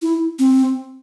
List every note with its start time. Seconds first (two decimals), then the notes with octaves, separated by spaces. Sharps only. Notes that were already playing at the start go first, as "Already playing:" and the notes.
0.02 E4
0.39 C4